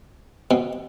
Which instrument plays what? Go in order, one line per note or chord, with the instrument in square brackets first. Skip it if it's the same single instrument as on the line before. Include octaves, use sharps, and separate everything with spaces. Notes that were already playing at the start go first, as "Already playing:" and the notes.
[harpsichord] B2